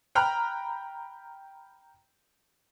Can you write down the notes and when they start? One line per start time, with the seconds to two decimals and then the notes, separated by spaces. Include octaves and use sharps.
0.15 G5 A#5 B5 F6 F#6